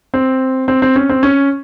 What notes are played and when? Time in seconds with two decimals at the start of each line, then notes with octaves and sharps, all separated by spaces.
0.14 C4
0.68 C4
0.82 C4
0.96 C#4
1.09 C4
1.23 C#4